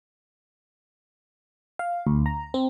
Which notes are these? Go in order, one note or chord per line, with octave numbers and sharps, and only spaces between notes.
F5
D2
A#5
C4